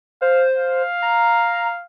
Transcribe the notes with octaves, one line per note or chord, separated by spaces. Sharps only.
C5 F5
F5
A#5